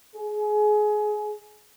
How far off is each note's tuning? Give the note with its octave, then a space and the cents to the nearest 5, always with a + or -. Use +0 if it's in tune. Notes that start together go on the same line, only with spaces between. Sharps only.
G#4 +25